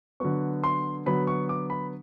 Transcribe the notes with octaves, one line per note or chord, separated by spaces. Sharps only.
D3 F#3 B3 C#6
C6
D3 F#3 B3 B5
C#6
D6
B5